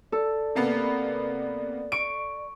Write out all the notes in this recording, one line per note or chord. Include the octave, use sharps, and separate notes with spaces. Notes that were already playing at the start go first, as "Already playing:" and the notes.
A4 D5
C3 A#3 B3
C#6 D7